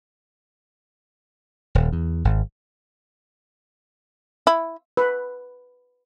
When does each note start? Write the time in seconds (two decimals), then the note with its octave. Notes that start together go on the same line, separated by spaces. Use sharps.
1.75 D#1
1.92 E2
2.25 G#1
4.47 E4
4.97 B4